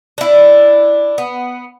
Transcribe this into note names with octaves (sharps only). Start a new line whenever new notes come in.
D4 E4
B3